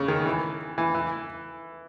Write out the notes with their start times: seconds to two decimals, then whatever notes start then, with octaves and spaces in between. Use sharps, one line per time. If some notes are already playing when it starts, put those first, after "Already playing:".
Already playing: C#3
0.08 D#3
0.26 E3
0.78 E3
0.95 E3